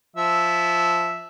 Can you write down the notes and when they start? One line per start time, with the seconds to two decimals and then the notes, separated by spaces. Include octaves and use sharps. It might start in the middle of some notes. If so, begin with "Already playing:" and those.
0.17 F3 E5